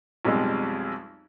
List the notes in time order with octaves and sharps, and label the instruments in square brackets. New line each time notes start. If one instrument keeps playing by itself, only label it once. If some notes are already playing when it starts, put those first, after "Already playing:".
[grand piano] B1 F2 G3 G#3